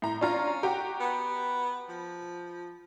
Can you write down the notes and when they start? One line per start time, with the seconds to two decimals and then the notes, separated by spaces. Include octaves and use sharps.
0.02 A2 A#5
0.21 C#4 D4 F4 A#5
0.63 F#4 G4 A#5
1.00 B3
1.89 F3